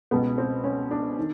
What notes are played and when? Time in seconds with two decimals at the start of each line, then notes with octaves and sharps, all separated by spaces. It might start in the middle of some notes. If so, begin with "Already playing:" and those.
0.11 C#2 B2 B3
0.38 C4
0.64 C#4
0.91 D4
1.19 D#3